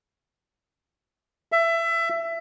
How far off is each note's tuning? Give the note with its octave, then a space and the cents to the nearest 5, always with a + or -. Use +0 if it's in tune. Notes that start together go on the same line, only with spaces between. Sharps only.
E5 +20